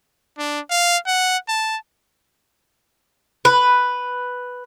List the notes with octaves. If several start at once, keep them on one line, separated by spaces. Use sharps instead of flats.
D4
F5
F#5
A5
B4